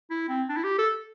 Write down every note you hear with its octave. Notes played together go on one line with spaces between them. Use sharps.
E4
C4
D4
E4
G4
A4